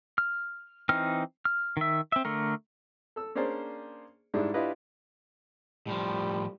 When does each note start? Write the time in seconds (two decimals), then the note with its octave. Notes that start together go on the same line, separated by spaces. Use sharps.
0.18 F6
0.89 E3 C4 D#4 F6
1.45 F6
1.77 D#3 E5
2.12 C4 E5
2.25 D3 A3 A#4
3.16 A4 E6
3.35 A#3 C#4 D4 G#4 C5 D5
4.34 G#2 G3 G#3 D4 E4
4.54 D4 E4 F4 G4 B4 D#5
5.87 A2 F3 G3